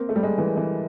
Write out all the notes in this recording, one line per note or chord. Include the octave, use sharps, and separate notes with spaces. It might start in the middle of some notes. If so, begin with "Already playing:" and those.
Already playing: A#3 C4
A3
G3
G#3
E3
E3